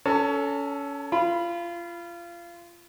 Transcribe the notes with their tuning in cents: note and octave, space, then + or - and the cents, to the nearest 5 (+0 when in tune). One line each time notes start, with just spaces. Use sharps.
C#4 +25 A4 +0 A5 +45
F4 -25 B5 +0